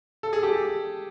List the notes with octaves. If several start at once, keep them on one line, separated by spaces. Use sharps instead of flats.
A4
G#4
G4 A4